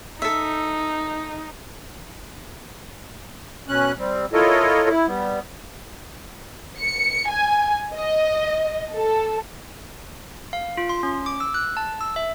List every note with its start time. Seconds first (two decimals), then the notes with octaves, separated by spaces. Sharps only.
0.22 D#4 A4 E5
3.68 B2 C#4 F#6
3.98 G3 C4
4.33 E4 F4 A4 A#4 C#5 D#5
4.89 E4
5.07 G3 B3
6.79 C#7
7.30 G#5
7.94 D#5
8.94 A4
10.53 F5
10.77 F4
10.89 C6
11.03 C#4
11.26 D6
11.40 E6
11.54 F#6
11.77 A5
12.01 E6
12.16 E5